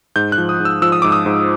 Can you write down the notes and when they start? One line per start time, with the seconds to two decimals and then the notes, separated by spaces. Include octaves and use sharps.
0.16 G#2 G6
0.32 F#6
0.38 F3
0.49 D#6
0.60 G#2
0.65 E6
0.82 F3 E6
0.92 D#6
1.02 G#2 D6
1.12 D#6
1.26 G#2